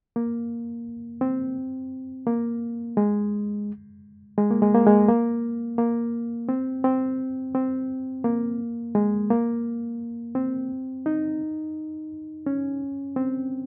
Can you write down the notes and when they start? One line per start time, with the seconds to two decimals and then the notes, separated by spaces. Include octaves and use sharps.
0.16 A#3
1.21 C4
2.27 A#3
2.97 G#3
4.38 G#3
4.51 A#3
4.62 G#3
4.75 A#3
4.87 G#3
5.08 A#3
5.78 A#3
6.49 C4
6.84 C4
7.55 C4
8.24 A#3
8.95 G#3
9.30 A#3
10.35 C4
11.06 D#4
12.46 C#4
13.16 C4